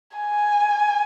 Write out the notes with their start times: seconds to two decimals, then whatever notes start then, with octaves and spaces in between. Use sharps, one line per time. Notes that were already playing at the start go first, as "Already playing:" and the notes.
0.17 G#5